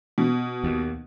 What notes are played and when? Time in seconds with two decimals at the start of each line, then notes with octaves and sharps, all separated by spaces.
0.18 B2
0.64 D#2